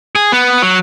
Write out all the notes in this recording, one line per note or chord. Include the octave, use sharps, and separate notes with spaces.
G#4
B3
F#3